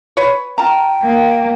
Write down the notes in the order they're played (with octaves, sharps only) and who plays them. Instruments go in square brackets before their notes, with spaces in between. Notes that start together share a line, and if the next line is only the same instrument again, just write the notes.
[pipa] B4 C#5
[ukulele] F4 A5 A#5 [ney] G5
[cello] A#3